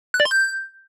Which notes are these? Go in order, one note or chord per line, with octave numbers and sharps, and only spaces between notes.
F#6
D5
C6
G6